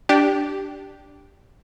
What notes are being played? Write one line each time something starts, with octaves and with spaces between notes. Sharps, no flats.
D4 G4